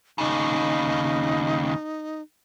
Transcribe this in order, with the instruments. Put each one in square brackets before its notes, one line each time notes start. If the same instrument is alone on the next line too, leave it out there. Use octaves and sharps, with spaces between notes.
[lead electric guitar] D#2 C#3 [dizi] D#4